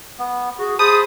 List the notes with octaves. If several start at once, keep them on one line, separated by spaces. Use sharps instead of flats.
B3
F#4 G#4
G#4 C5 A5 B5 D#6